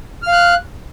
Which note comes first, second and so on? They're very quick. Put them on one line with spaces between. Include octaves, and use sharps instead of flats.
F6 F5 F#6